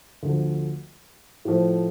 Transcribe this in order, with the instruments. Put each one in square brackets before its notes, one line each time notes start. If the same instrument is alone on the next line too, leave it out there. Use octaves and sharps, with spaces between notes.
[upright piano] D2 D3 F3
A2 F3 A3